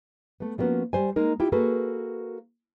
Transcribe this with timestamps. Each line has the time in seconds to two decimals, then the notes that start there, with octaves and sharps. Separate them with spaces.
0.40 A3 B3
0.58 F3 G3 A#3 B3 C#4 F#4
0.93 G3 C5 G#5
1.16 G#3 A#3 D#4 A#4
1.40 E4 F4 G4 G5
1.52 A#3 F#4 G#4 A4 B4